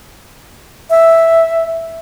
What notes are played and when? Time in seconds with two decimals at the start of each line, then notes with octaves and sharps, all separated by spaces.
0.90 E5